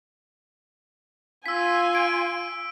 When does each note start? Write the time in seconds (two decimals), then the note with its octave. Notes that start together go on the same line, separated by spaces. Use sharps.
1.46 F4 G#5 E6 B6
1.95 D7